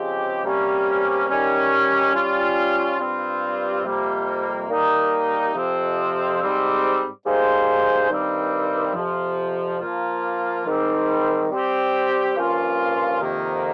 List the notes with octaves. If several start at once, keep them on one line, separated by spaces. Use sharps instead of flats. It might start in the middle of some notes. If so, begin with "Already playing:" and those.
Already playing: C#3 F3 G#3 C4 G4
C3 G3 A#3 C#4
D#3 G3 C#4
G3 C#4 F4
G2 G3 C4 F4
F2 C3 G3 A#3
G3 A#3 D#4 A#4
F2 C3 F3 C4
G#2 G3 C4
G3 A#3 D#4 G#4 C5
G2 D#3 G3 C4
F2 C3 F3
F3 A#3 F4
G#2 D#3 G3 C4
G3 C4 G4
G2 F3 A#3 C#4 F4
F2 C3 D#3 A#3